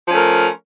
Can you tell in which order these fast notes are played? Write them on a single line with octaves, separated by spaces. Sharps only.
F3 C#4 A3 A#4